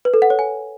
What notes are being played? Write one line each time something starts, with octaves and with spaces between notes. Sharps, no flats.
B4
A4
F#5
C#5
G#5